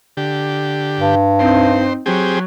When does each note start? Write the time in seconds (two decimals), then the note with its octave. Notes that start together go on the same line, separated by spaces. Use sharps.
0.17 D3 G4
0.99 G2
1.39 C4 D#4 C5
2.06 F#3 C4 G4 G#4